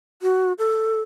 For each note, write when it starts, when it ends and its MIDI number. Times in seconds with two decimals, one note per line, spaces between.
0.22 0.53 66
0.59 1.01 69